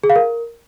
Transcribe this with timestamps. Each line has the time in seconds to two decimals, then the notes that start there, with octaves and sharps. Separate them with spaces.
0.04 G#4
0.10 F5
0.16 A#4